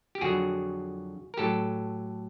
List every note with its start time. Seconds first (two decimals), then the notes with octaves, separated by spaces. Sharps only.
0.15 G4
0.21 F2 D3 F#3 F#4 G#4
1.34 A#4
1.37 A2 F#3 G4 A4